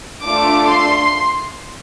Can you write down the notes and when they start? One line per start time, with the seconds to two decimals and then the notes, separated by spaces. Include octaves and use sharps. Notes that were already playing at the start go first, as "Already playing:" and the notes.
0.21 A3 D4 F4 A4 D6
0.67 C6